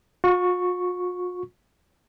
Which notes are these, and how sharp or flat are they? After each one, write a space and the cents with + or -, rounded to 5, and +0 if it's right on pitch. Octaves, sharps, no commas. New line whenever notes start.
F4 +45 C#6 +0